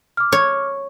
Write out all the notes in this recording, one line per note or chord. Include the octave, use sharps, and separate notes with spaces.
D6 F6
C#5